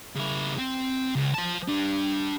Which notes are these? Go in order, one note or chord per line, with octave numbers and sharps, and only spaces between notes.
C#3 E4
C4
C#2
F3 A5
D4 G4